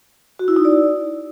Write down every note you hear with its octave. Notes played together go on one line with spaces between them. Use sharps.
F#4
E4
D#4
D5